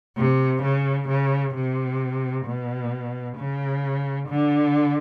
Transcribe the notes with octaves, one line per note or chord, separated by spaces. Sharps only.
C3
C#3
C#3
C3
B2
C#3
D3